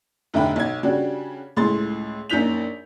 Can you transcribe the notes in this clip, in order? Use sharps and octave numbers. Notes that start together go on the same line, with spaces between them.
F1 B1 D3 E5 G5 B5
B1 G#6
C#3 G3 D4 F#4 G4
C#2 A2 G#4 C6 A6
A#1 F#2 D#4 G6 B6 F7